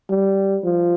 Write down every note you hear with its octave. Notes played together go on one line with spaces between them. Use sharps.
G3
F3